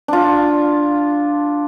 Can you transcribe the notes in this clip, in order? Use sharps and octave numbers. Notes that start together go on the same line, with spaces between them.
D4 F4